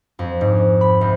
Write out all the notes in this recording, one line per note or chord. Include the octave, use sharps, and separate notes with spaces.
F2
G#2
B5
C2